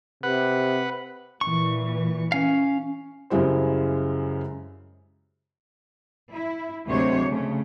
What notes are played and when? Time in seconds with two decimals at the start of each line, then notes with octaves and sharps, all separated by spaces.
0.23 C3 B4 F#5
1.41 A#2 E3 C#6
2.32 C#4 F5
3.30 F#2 C#3 G3 G#3 E4 C5
6.33 E4
6.88 D2 C3 F#3 G#3 C5 C#5
7.29 C#3 A3